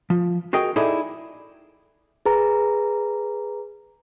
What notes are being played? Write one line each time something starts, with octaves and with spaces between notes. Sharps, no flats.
F3
F#4 G#4 A#4 D#5 G5
D#4 E4 G#4 A4 D5
G#4 B4 A#5